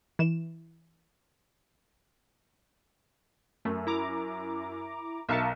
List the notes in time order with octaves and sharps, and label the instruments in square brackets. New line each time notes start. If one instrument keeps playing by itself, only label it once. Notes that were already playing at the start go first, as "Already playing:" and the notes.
[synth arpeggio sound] E3 E7
[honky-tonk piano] F#2 [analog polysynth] A3
[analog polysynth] E4 A#5 D6
[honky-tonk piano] B1 A#4 C#7 [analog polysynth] E5 F5 A5